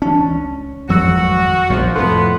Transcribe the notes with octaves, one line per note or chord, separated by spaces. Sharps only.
E3 C#4 D4 A5
C#2
G#1 F2 F#3 G3 F#4 E6
E1 A#1 F3
F2 A2 C3 B3 A4 C6 F#6